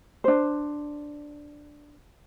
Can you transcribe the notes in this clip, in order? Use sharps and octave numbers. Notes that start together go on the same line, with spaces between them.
D4 C5